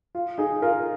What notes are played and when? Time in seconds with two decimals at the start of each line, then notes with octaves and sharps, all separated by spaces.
0.15 F4
0.38 D#4 G#4
0.62 F4 A#4